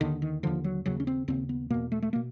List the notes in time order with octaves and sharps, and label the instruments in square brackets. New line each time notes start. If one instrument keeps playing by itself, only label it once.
[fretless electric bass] D#2 D3 D#3
D#3
D#2 D3 F3
F#3
D#2 C#3 F#3
C#4
C4
D#2 C#3 C4
B3
E2 B2 A#3
A3
A3
A#3
B2